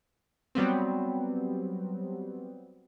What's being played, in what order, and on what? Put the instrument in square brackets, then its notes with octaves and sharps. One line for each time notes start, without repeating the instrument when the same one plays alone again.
[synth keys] F#3 G3 B3 C4